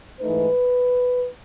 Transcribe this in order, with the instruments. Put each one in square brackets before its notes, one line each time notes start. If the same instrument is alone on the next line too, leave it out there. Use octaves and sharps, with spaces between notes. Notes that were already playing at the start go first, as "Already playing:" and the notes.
[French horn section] G#2 E3 A3 D#4 B4